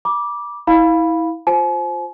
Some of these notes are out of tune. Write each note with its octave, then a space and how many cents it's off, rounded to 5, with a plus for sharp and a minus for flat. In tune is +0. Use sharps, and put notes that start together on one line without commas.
B5 -35 D6 +0
E4 -25 F5 +0 B5 -5
F4 +15 C5 +0 G#5 +45